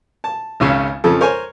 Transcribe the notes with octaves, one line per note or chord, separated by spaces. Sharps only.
A5
G#1 C#2 C#3 C#4 F5
F2 C#3 F3 F4 A4
A#4 C5 C#5 G#5